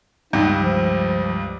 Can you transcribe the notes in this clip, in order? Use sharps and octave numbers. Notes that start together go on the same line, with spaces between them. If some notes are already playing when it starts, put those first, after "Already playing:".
C#2 G2 D#4
F3